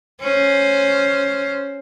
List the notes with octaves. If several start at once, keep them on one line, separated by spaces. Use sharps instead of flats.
C#4 C5